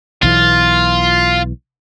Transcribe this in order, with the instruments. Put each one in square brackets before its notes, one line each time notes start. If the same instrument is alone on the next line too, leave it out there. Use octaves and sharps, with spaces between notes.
[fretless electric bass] B1 E3 [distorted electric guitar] F4